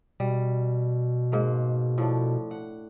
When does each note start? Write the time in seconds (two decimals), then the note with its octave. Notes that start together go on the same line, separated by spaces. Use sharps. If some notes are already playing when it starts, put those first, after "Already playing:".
0.20 B2 G3
1.32 G#2 A#3 F5
1.98 A2 F3 D4
2.51 F#5